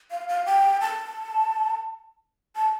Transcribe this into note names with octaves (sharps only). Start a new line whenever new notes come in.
F5
F5
G5
A5
A5